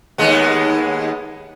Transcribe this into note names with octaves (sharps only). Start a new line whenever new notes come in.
D#2 G#3 B3